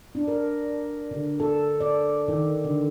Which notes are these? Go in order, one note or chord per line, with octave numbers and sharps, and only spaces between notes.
D4
A#4
D3
A4
D5
D#3
D3